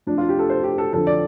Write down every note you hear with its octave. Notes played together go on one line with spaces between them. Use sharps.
F2 F3 A3 D4
F4
G4
A4
C5
G4
A4
F2 D3 F3 A4
D5